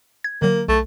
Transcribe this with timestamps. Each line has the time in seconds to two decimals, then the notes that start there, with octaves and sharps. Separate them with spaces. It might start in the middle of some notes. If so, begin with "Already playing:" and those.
0.24 G#6
0.42 D3 F#3 A#3
0.68 B1 A3